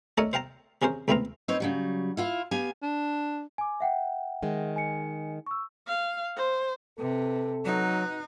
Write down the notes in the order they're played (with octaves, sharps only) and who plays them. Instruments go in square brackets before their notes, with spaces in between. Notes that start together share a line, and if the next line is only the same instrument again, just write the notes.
[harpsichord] A3 D4 A4 A#4 C#5 D#5
C5 F5 G5 A5 A#5
C3 C#4 G#4 A#4 C5
C#2 A3 B3 C4 F5 A#5
[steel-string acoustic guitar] C4 D#4 B4 C#5
C#3 F#3 G3
E4 F4 F5
B3 G4 F5 G#5
[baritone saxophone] D4
[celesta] G#5 D6
E5 F#5 G5
[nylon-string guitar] D#3 G#3
[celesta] G#5 C#7
C#6 E6
[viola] F5
C5
[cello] C3 [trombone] A4 [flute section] B4
[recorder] F#3 [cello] D#4 [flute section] F#4 B4 F#6